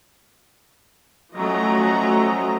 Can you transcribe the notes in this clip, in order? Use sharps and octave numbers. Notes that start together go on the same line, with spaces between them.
F3 F#3 A3 C#4 D#5 A#5